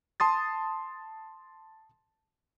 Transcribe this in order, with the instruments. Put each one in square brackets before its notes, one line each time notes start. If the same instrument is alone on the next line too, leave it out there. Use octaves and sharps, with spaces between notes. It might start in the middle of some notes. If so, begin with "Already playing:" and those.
[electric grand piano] A5 C6 D#6 A6